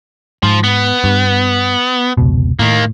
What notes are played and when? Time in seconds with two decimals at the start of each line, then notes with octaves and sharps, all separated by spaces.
0.43 G#2 F3
0.64 B3
1.04 G2
2.17 F1 C#2 B2
2.59 A2 D#3 A#3